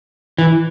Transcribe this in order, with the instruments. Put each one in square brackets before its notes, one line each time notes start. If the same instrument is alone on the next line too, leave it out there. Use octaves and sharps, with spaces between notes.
[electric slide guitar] E3